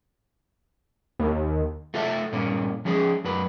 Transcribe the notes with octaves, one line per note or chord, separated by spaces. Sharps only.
D#2
A3 F4 A4 E5
G2 A#2 A#3 C#4
F3 G#3 C#4 G#4
F#2 B4